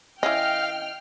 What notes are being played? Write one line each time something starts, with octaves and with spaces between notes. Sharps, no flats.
E3 C#4 D#5 F5 G5 F6